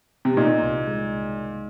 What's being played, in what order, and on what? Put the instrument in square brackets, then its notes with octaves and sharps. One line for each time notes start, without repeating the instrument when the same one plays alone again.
[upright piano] C3
[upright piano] A#2 [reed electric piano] D#4
[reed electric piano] C2
G#3